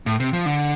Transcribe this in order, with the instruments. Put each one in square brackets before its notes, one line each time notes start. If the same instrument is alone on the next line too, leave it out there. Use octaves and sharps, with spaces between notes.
[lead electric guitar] A2
C3
F3
D3